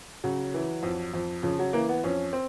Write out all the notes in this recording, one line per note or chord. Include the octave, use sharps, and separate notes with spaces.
C#3 F#3
E3
F2
F2
C#3 F3
F#3
E3 A#3
B3
F2 C#4
C4